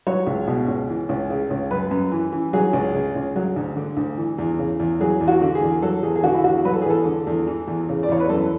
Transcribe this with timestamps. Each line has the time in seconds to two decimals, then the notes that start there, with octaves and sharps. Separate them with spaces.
0.07 F#3 C#5
0.27 C#2
0.47 B2
0.68 C#2
0.89 E3
1.09 C#2
1.30 C#3
1.50 C#2
1.71 F#2 B4
1.91 F#2
2.12 E3
2.32 E3
2.53 F#3 G#4
2.73 C#2
2.94 C#3
3.15 C#2
3.36 F#3
3.56 D2
3.77 D3
3.97 D2
4.17 E3
4.38 E2
4.59 C#3
4.79 E2
5.00 F#3 G#4
5.21 E2
5.28 F#4
5.42 D3
5.55 G#4
5.62 E2
5.82 F#3 A4
6.03 E2 G#4
6.16 G#4
6.24 D3 F#4
6.34 E4
6.44 E2 F#4
6.64 F#3 B4
6.73 A4
6.82 G#4
6.86 E2 A4
7.06 D3
7.27 E2
7.47 E3
7.68 E2
7.89 C#3
8.03 D5
8.09 E2 C#5
8.20 B4
8.29 F#2 A4